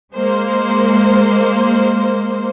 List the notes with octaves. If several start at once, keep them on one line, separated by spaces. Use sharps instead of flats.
G#3 A#3 C5